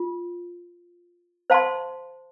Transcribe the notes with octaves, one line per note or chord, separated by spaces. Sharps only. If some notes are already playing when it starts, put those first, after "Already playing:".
Already playing: F4
C5 F5 A5 C6